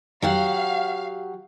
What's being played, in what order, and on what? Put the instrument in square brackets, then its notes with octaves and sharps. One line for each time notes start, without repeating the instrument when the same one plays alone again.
[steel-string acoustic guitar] F#3 G4 F#5 [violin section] F5